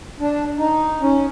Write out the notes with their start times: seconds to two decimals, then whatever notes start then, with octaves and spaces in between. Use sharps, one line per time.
0.20 D4
0.58 D#4
1.01 C#4